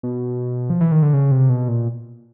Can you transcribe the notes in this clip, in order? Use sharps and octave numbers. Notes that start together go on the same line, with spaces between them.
B2
F3
E3
D#3
D3
C#3
C3
B2
A#2